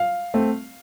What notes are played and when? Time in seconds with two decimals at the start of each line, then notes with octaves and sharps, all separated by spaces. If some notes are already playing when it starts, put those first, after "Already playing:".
Already playing: F5
0.34 A3 C4